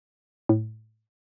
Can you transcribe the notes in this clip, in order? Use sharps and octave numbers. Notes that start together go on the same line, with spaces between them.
A2